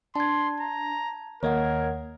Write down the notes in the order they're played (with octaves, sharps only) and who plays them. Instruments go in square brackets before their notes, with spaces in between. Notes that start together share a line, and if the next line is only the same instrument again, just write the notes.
[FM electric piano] D4 [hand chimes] A5 G#6 [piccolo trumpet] C6
[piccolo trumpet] A#5
[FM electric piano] D#2 A#3 G#6 [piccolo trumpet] A#4 [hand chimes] C#5 D#5 F#5